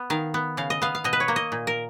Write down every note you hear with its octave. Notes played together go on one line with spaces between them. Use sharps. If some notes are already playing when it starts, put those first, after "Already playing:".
Already playing: B3
D#3 F5
B3
C#3 F5
D#5
B3 F5
F5
B2 D#5
B4
C#5
A#3
D#5
A#2
A#4